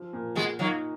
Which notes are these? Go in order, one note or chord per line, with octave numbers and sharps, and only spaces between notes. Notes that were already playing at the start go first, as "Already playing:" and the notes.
Already playing: F3
A#2
G#3 B3 F#4
F#3 A#3 D#4